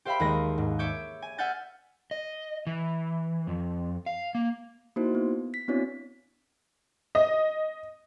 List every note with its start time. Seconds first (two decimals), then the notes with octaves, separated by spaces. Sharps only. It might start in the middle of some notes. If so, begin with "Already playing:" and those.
0.05 G4 C5 E5 F5 G5 B5
0.20 D#2 G#3 A#6
0.58 G#2
0.79 C#5 E5 D6 G6
1.22 G#5
1.38 E5 F#5 G#5 F6 G6 A6
2.11 D#5
2.67 E3
3.47 F2
4.06 F5
4.35 A#3
4.96 A#3 D#4 E4 F#4 C5
5.15 B3
5.54 B6
5.68 B3 C4 D4 E4 F#4 C#5
7.15 D#5